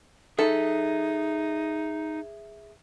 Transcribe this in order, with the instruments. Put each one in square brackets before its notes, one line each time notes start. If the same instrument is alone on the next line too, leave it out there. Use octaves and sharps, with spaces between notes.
[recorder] D#4 [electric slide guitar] G#4 E5 [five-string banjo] A4